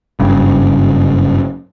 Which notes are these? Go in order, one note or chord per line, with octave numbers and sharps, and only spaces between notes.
F#1 G2 C#3